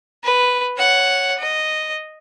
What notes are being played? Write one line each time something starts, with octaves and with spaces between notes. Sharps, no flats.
B4
C#5 F#5
D#5